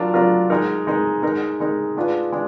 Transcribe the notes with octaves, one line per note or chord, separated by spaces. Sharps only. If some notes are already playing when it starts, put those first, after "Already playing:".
Already playing: F#3 D4 F4 A#4
F#3 D4 F4 A#4
G#3 D#4 A#4
G#3 D#4 A#4
G#3 D#4 A#4
G#3 D#4 A#4
G#3 D4 F4 B4
G#3 D4